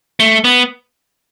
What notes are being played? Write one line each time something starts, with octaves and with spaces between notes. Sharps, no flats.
A3
B3